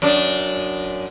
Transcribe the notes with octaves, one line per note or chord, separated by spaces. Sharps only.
F#2 D4